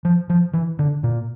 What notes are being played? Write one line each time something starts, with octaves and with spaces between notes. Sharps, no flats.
F3
F3
E3
D3
A#2